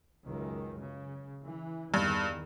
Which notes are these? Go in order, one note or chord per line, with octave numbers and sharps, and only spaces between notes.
C#2 F#2 D#3
C#3
E3
E2 G2 D#3